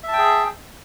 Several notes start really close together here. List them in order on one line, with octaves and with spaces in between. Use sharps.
E5 A5 G5 G#4